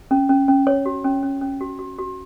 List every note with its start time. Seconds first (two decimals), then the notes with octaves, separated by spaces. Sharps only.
0.11 C#4
0.29 C#4
0.48 C#4
0.67 C#5
0.86 F#4
1.05 C#4
1.23 C#4
1.41 C#4
1.61 F#4
1.79 F#4
1.98 F#4